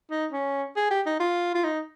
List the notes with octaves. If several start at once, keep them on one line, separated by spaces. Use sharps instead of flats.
D#4
C#4
G#4
G4
D#4
F4
F4
D#4